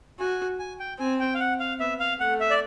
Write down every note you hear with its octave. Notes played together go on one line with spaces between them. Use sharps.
F#4 G#5
G#5
G5
C4 G#5
G5
F5
F#5
F5
B3 E5
F5
A3 F#5
E5
D5